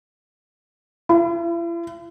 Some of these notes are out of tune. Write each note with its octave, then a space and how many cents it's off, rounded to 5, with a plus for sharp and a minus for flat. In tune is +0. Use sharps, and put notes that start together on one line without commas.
E4 +45